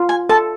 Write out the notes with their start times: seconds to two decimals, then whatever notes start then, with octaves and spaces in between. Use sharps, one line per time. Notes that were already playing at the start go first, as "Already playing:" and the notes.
Already playing: F4
0.09 G#5
0.29 A4 A5